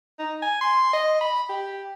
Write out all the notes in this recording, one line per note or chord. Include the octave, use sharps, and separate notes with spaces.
D#4
G#5
C6
D#5
B5
G4